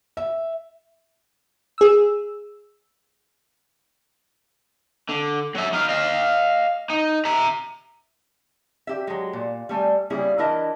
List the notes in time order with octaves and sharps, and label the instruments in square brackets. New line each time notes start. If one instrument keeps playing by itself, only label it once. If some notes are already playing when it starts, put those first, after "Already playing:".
[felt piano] E5
[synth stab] G#4 E6
[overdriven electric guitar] D3
F#3 E5
D#4 F5
D#5 F5
D#4
E5 A#5
[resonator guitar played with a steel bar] G4 E5
F#3 G#3
A#2
G3 A3 G#5
C#3 G3 A#3 E4 G#4
E3 D4 E4 A#4 D#5 E5